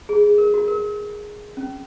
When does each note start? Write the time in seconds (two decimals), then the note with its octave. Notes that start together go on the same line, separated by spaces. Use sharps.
0.09 G#4
0.23 G#4
0.38 A#4
0.54 F#4
0.68 A#4
1.57 C#4